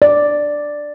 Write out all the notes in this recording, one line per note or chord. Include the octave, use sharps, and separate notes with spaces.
D5